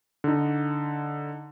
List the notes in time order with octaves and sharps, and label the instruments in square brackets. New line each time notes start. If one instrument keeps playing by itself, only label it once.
[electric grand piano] D3 D#4